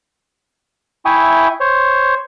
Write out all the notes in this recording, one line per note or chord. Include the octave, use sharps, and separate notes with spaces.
E4 E5 G5 G#5 C#6 D#6
C5 C#5